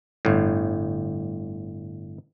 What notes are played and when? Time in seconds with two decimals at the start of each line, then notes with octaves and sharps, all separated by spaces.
0.25 G1 A2